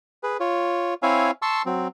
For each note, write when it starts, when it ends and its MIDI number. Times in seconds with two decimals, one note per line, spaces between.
0.23 0.37 68
0.23 0.37 71
0.40 0.94 65
0.40 0.94 73
1.03 1.31 60
1.03 1.31 64
1.03 1.31 73
1.03 1.31 76
1.03 1.31 77
1.03 1.31 80
1.42 1.62 81
1.42 1.62 84
1.42 1.62 85
1.42 1.62 88
1.66 1.88 54
1.66 1.88 60